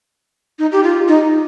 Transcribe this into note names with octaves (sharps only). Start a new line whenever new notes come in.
D#4
G4
F4
D#4